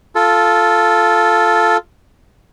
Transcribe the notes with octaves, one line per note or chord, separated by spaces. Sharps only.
F4 A4